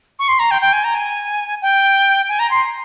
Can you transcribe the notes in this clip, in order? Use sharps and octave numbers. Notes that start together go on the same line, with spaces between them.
C#6
C6
A#5
G5
G5
G#5
A#5
G#5
G5
G#5
A#5
C6